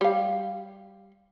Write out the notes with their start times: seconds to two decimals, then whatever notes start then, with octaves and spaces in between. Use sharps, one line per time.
0.01 G3 F5